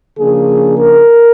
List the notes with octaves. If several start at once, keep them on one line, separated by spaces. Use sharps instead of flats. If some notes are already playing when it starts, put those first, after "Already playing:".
C#3 F3 A#3 D4 G#4
A#4